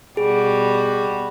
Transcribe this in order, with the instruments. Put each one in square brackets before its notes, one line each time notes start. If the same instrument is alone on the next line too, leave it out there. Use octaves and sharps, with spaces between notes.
[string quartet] B2 G3 F#4 [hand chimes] G#4